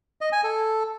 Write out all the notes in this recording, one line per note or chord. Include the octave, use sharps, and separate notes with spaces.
D#5
G#5
A4